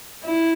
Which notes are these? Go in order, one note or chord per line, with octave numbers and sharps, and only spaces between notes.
E4